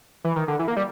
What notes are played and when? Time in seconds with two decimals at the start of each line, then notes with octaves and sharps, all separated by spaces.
0.24 E3
0.36 D#3
0.48 D3
0.59 E3
0.68 A#3
0.76 G3